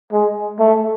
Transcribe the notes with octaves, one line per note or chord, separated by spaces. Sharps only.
G#3
A3